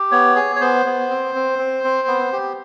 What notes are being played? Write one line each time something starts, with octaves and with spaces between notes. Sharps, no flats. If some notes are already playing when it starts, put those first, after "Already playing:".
Already playing: G4
B3 C#5
G#4
C#5
B3 C5
B3
C4
C4
C4
C4
B3
G4